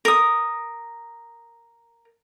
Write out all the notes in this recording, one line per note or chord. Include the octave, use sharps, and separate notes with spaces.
A#4 D#6